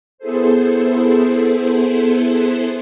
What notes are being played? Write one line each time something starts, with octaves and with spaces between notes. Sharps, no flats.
B3 E4 G#4 A4 C5